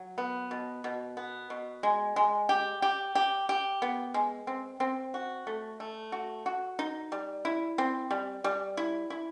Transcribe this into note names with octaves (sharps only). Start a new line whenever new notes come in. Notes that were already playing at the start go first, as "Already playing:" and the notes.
Already playing: F#3
B3
B2
B2
B3
B2
G#3
G#3
G4
G4
G4
G4
B3
G#3
C4
C4
F#4
A3
A3
F#4
F#4
D#4
G3
E4
C4
G3
G3
E4
E4